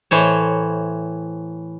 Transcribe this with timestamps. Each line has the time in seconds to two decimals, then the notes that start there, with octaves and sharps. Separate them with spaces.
0.11 A2 E3 C5 C#5